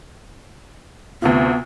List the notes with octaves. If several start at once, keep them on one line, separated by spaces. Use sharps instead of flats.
D2 C3 B3 F4